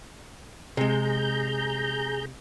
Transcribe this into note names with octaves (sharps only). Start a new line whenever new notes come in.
C3 G#3 G#4 A#5 G6